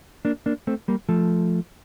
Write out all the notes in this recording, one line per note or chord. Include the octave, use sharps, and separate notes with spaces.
A#3 D4
A#3 D4
A3 C4
G3 A#3
F3 A3